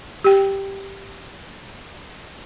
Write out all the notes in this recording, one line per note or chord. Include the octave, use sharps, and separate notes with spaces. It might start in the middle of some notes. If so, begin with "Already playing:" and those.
G4 G5